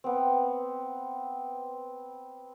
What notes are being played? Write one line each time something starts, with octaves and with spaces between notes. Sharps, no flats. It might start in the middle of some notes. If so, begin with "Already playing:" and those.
B3 C4